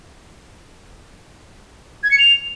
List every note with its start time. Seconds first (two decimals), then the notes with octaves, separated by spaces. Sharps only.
2.04 G#6
2.11 C#7
2.19 F7